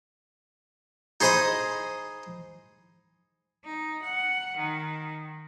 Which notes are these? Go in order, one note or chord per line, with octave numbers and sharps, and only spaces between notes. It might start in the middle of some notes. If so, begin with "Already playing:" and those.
D#4 G#4 C5 D#5 B5 D#6
D#4
F#5
D#3